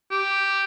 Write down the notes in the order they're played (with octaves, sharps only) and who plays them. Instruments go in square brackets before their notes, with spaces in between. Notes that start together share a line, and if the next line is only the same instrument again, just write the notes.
[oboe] G4